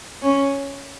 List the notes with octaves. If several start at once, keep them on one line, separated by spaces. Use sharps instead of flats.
C#4